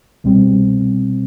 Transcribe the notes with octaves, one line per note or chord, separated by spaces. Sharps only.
C2 B2 G3 C4